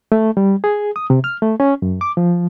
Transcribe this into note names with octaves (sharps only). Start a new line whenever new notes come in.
A3
G3
G#4
D#6
C3
F6
A3
C#4
F#2
D6
F3